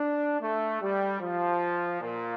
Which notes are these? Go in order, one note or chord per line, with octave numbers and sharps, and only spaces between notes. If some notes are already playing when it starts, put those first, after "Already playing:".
Already playing: D4
A3
G3
F3
A#2